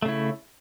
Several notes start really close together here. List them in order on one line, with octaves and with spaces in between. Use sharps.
A3 C#3 E4